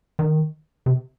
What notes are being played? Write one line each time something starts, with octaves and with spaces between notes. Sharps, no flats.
D#3
C3